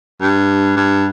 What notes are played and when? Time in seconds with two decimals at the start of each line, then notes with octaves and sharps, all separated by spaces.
0.21 G2
0.77 G2